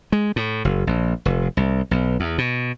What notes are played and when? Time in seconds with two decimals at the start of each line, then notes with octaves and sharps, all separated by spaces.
0.12 G#3
0.36 A2
0.65 F#1
0.87 A#1
1.25 F1
1.57 C2
1.91 B1
2.20 E2
2.38 B2